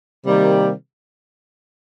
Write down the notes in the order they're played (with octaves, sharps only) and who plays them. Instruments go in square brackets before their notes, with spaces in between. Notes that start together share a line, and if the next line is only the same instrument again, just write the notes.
[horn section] C3 D#3 G3 A#3